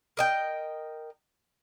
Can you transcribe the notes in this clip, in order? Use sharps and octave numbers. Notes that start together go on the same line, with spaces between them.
A#4 D#5 G5